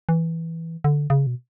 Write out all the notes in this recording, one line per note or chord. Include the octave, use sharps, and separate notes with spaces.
E3
D3
C#3
B2